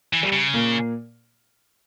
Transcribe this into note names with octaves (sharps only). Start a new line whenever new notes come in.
E3
G3
C#3
A#2 A#3